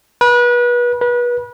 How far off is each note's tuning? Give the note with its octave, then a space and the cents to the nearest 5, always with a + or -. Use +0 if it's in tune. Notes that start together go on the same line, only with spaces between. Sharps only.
B4 -30
B4 -30